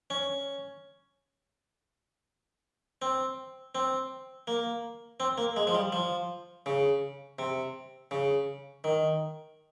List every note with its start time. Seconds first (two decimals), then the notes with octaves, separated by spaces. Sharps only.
0.10 C#4
3.02 C4
3.75 C4
4.47 A#3
5.20 C4
5.38 A#3
5.56 G#3
5.67 F3
5.75 G3
5.92 F3
6.66 C#3
7.39 C3
8.11 C#3
8.84 D#3